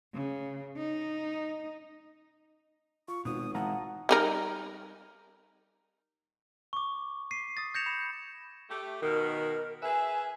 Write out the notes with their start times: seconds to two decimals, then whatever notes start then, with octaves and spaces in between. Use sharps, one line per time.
0.14 C#3
0.77 D#4
3.08 F4 C#6
3.25 G#1 B2 D#6
3.55 E3 G#3 E4 F5 F#5 A5 A#5
4.09 G3 D#4 A#4
6.73 C#6 D6
7.31 B6 C7 D#7
7.57 D#6 A6
7.74 G6 G#6 A#6 C#7 E7 F7
7.86 B5 E7
8.70 A3 G4
9.02 B2 D#3 A#4
9.83 G#4 B4 E5 G#5